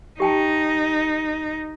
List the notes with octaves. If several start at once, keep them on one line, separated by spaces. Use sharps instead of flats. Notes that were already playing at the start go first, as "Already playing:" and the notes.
D#4 G4 G5 A5